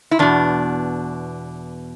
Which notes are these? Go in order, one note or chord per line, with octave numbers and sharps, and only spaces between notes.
E4
E2 B2 D4